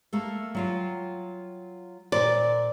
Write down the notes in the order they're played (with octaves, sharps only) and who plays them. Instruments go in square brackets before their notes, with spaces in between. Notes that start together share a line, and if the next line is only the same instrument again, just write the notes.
[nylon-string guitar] A3 A#3 A4
F#3 F4 G5
[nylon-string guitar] A#2 A#4 C5 [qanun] D5